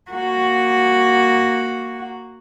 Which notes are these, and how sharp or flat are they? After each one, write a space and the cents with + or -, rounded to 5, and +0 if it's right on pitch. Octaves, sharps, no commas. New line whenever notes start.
A#3 +0 F#4 +0